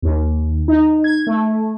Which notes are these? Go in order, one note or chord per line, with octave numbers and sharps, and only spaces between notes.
D#2
D#4
G#6
A3